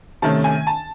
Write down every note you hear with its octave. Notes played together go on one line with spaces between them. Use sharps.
C3 D#3 A3 C#4 A5
G#5
A5